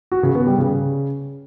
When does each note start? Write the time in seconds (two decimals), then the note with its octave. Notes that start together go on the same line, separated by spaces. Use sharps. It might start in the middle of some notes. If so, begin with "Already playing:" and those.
0.12 F#4
0.23 C#3
0.35 B3
0.47 G3
0.58 C#3